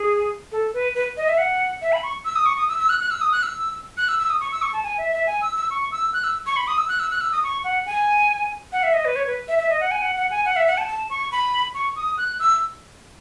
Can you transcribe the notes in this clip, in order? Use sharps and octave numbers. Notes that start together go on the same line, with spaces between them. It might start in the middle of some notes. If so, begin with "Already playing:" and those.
Already playing: G#4
A4
B4
B4
D#5
E5
F#5
E5
B5
C#6
E6
D#6
C#6
D#6
E6
E6
F#6
F#6
E6
D#6
F#6
E6
F#6
E6
E6
D#6
C#6
E6
C#6
A5
G#5
E5
E5
G#5
E6
E6
C#6
E6
F#6
E6
C#6
B5
D#6
E6
F#6
E6
F#6
E6
D#6
C#6
F#5
G#5
F#5
E5
D#5
B4
C#5
B4
E5
E5
D#5
F#5
G#5
F#5
F#5
G#5
F#5
E5
F#5
A5
A5
C#6
B5
C#6
D#6
F#6
E6